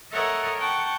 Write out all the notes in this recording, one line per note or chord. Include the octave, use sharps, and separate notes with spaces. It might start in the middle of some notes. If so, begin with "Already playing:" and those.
A4 A#4 C#5 D#5 E5 F#5
F#5 G5 A5 C#6